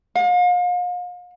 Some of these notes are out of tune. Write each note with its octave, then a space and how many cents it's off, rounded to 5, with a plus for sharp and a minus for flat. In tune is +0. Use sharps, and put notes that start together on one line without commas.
F5 +40